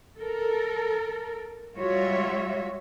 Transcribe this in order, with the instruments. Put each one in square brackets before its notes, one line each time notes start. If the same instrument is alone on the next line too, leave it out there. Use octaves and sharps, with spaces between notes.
[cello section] A4 A#4
G3 G#3 F4 F#4 C#5 E5